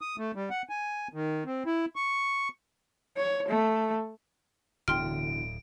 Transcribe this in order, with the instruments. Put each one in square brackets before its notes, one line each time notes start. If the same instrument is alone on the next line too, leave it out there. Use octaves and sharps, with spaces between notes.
[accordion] D#6
A3
G3
F#5
G#5
D#3
C4
E4
C#6
[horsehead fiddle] C#5
A3
[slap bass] D1 [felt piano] B2 D3 E3 [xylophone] G5 C6 F6 [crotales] D7